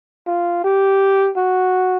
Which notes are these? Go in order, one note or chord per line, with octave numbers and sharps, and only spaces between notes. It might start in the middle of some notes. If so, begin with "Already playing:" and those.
F4
G4
F#4